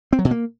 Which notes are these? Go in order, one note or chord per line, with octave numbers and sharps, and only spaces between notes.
C4
F#3
B2
A#3